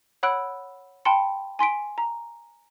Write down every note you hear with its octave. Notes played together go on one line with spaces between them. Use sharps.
C#5 F#5 B5 E6 F#6 D7
G5 A5 B5 C6 C#7
G#5 C6 B6 D7
A#5